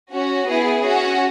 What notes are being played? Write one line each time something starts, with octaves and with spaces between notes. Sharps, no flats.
C#4 F#4
B3 E4 G#4
C#4 F#4